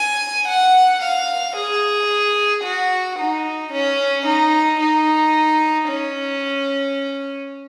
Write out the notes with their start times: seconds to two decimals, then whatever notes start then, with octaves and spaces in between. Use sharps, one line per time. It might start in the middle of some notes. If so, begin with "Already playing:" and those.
Already playing: G#5
0.48 F#5
1.02 F5
1.56 G#4
2.64 F#4
3.19 D#4
3.72 C#4
4.26 D#4
4.80 D#4
5.88 C#4